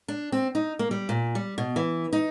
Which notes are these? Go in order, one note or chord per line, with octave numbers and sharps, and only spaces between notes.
D4
C4
D#4
A#3
G3
A#2
G3
B2
E3
D#4